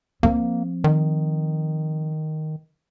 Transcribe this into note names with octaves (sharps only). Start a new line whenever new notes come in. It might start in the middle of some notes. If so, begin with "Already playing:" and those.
F3 A#3 C4
D#3